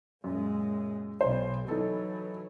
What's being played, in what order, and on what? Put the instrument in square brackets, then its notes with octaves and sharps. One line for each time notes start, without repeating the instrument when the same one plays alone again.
[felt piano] F#2 [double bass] A#2 G#3
[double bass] B1 [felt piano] C5
[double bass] E3 F#3 [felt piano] D#4 A4